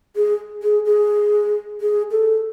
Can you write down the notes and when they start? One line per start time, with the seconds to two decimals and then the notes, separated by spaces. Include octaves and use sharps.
0.16 G#4
0.63 G#4
0.85 G#4
1.81 G#4
2.11 A4